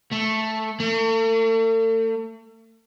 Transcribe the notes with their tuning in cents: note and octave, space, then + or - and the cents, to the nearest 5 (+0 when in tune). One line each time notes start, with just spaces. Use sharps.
A3 -5
A3 +40